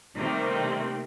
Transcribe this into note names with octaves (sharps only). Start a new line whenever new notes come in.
C3 D#3 G3 A3 A#3 C4